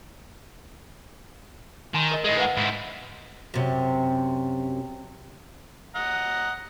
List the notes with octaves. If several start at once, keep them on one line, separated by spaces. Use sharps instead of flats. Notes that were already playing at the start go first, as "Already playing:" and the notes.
D#3 G#5 A#5 C6
A#4 D#5
A2 G#3 A4 D#5
B4 F5 F#5
G#2 E4
F#2 C3
D#5 F#5 A#5